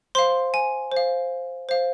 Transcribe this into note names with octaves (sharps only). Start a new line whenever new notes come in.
C5 F5 C6
G#5
C5 F5
C5 F5